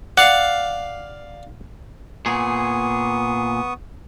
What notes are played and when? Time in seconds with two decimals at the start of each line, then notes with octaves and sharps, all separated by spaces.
0.17 D5 F5 F#5
2.26 A#2 B3 G#4 C#6 D#6